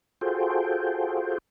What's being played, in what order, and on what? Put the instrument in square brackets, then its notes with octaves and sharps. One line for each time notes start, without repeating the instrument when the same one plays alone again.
[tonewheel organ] F4 F#4 G#4 A4 C5 G5